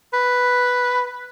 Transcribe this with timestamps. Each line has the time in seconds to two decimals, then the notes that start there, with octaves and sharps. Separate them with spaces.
0.13 B4